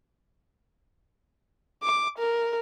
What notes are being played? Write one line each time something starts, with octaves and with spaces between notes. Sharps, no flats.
D6
A#4